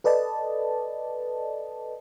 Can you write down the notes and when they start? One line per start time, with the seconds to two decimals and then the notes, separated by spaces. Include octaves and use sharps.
0.04 A4 B4 D5 D#5 A5